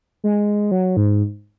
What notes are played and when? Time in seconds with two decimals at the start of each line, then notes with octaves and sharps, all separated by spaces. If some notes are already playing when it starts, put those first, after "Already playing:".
0.24 G#3
0.71 F#3
0.97 G#2